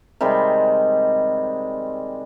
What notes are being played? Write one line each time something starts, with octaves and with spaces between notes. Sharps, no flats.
C3 D#3 G3 G#3